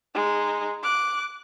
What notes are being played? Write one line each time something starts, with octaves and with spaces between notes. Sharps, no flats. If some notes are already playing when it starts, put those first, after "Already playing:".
G#3 D#4
D6 F#6